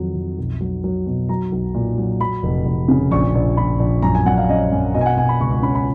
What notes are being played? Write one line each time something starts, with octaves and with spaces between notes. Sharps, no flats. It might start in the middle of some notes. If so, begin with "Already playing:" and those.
Already playing: F2 D#3 F#3
F2
B1
F#3
F#3
B2
F#3 A#5
B1
A#2
F#3
F#3 B5
F1
F1
C#3
A#1 C#6
A#1
A#1 B5
A#1
F#2 A#5
G#5
F#2 F#5
F5
C#4 D#5
F#2
B2 D#5
G#5
F#5
B2 G#5
B5
C#2 C#6
C#6
C#4 B5
B5